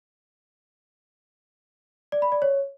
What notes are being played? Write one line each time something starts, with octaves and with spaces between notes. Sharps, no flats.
D5
B5
D5
C#5